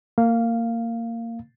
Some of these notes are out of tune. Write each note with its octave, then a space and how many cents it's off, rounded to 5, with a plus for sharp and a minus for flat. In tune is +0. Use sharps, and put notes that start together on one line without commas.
A#3 -25 F5 +0